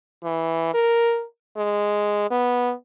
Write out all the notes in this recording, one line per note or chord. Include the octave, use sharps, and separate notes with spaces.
E3
A#4
G#3
B3